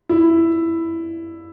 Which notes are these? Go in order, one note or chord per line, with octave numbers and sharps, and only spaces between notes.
E4